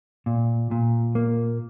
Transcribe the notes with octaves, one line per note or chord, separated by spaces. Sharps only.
A#2
A#2
A#3